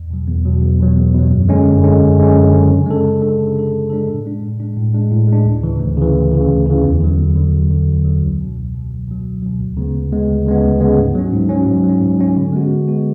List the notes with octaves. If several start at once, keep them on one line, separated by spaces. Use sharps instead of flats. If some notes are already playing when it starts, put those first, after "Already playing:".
Already playing: E2
B2 F#3
E2
B2 F#3
E2
B2 F#3
E2
B2 F#3
F#2
D3 G#3 C#4
F#2
D3 G#3 C#4
F#2
D3 G#3 C#4
F#2
D3 G#3 C#4
C#3
G#3 D4 A4
C#3
G#3 D4 A4
C#3
G#3 D4 A4
C#3
G#3 D4 A4
A2
G#3 D4
A2
G#3 D4
A2
G#3 D4
A2
G#3 D4
D2
C#3 E3
D2
C#3 E3
D2
C#3 E3
D2
C#3 E3
E2
D3 F#3
E2
D3 F#3
E2
D3 F#3
E2
D3 F#3
C#2
B2 F#3
C#2
B2 F#3
C#2
B2 F#3
C#2
B2 F#3
D2
C#3 G#3 B3
D2
C#3 G#3 B3
D2
C#3 G#3 B3
D2
C#3 G#3 B3
G#2
F#3 C#4
G#2
F#3 C#4
G#2
F#3
C#4
G#2
F#3 C#4
D3
G#3 B3 F#4
D3
G#3 B3 F#4